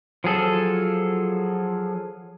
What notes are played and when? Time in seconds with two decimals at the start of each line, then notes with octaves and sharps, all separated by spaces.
0.24 F3 F#3 G#4 A4